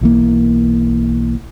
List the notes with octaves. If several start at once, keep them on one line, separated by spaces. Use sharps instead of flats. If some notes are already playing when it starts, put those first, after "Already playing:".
B1 E3 A#3